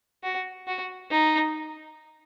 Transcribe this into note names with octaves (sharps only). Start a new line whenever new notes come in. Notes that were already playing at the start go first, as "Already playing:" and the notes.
F#4
F#4
D#4